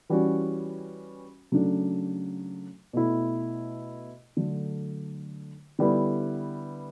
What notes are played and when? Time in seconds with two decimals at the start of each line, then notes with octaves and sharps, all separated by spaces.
0.10 E3 G3 C#4 F#4
1.52 C#3 F#3 A3 D4
2.93 B2 A3 E4
4.37 D3 F#3 A3
5.79 D3 G3 B3 E4